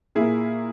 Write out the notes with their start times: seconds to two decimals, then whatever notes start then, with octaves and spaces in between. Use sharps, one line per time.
0.15 A#2 A#3 E4 G#4